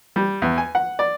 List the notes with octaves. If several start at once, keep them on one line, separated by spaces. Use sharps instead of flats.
G3
E2
G#5
F#5
D5